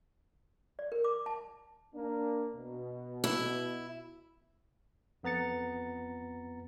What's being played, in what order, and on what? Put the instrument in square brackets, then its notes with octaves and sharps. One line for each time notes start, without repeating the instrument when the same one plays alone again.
[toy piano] D5
A#4
D6
A5
[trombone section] A#3 D4
B2
[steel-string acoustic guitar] E4
[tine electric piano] F2 B3 A#5 A6 C#7